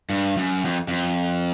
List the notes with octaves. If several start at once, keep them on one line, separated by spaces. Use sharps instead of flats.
G2
F#2
F2
F2